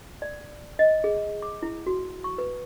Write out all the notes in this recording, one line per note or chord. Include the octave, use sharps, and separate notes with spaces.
D5
D#5
G#4
D6
E4
F#4
C#6
B4